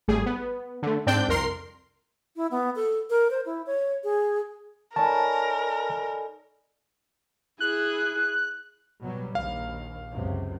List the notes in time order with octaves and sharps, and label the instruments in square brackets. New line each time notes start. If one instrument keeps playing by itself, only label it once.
[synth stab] G#1 G3 A3 G#4
B3
D3 A3
G#2 C4 D4 D5 G5 G6
C2 F2 A#4 C6 C7
[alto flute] E4
B3
A4
A#4
C5
E4
C#5
G#4
[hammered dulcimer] D#4 A4 C#5 [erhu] A#4 [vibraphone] D5 G#5 B5 [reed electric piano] A5
[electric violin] E4 G#4 [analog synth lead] F#6
[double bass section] B2 F#3 G3
[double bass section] A#1 D#2 [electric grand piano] F5
[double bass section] C#2 F#2 C3